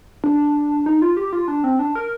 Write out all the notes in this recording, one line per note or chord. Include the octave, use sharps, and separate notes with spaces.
D4
D#4
F4
G4
F4
D4
C4
D4
A#4